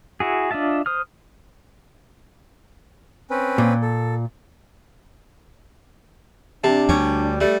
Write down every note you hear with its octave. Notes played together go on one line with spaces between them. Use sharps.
E4 F#4 G#4
D4 F4 D#5 E5 A5
C5 D#6 F6
C4 C#4 B4
A#2
A4
C3 D4 A5
D2 G3 C#4
G3 A3